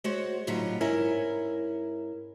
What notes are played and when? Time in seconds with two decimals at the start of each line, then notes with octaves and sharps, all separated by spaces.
0.04 G#3 F#4 C5 C#5 F#5
0.47 A2 D3 F#3 G3 D#4 F4
0.81 G#2 C#4 E4 A#4